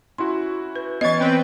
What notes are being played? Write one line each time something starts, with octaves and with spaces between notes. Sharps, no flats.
C#4 E4 F#4 C6
B4
E3 B3 C#4 D#5 G#6 A6
C4 B4 G5